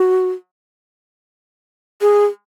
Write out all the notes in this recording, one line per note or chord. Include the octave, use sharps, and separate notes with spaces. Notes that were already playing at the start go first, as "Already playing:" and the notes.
Already playing: F#4
G#4